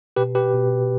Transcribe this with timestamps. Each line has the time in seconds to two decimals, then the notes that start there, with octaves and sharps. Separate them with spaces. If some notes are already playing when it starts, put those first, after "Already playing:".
0.16 B2 G4 B4
0.35 G4 B4
0.53 B2